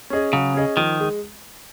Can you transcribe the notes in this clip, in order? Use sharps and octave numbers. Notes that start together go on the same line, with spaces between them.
C#4 G#4 D#5
C#3 F#3
C#4 G#4 D#5
D#3 F3
G#3